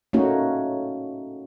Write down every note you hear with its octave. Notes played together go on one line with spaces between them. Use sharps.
A3 A#3 C#4 D#4 F#4